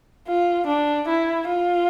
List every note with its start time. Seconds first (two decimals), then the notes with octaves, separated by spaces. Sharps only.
0.28 F4
0.67 D4
1.08 E4
1.49 F4